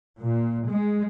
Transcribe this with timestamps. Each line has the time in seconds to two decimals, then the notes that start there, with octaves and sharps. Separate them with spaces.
0.17 A#2
0.68 G#3